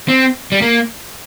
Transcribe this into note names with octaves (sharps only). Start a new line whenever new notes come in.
C4
G3
A#3